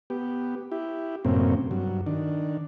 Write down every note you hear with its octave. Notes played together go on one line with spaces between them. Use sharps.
B3 G4
E4 G4
F#2 A2 C3 A#3 C4 C#4
G2 F#3
D#3 D4